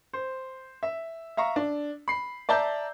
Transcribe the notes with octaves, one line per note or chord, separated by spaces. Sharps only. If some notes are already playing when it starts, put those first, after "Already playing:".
C5
E5
E5 F5 A#5 C#6
D4
B5 C7
D5 E5 A5 A#5 G6